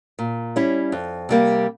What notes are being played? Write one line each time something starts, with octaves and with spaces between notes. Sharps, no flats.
A#2
G3 C#4 E4
F2
C3 G3 A#3